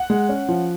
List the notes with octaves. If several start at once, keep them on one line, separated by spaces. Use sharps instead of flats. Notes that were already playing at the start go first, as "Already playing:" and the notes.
Already playing: F#5
G#3
C#4
F3